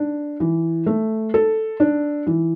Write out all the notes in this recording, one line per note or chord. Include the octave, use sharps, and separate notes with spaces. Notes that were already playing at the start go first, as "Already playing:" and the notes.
Already playing: D4
E3
A3
A4
D4
E3